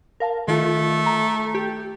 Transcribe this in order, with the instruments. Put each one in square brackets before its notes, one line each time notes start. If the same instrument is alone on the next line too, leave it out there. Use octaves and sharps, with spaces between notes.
[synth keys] A#4 F5 A5
[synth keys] D#3 F4 [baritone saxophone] A3
[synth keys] A#5
G4